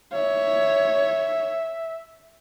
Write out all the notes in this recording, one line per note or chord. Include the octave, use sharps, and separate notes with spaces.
C#5 E5